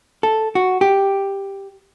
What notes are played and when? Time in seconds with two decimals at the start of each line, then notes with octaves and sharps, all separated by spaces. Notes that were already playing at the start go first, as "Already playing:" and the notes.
0.23 A4
0.55 F#4
0.81 G4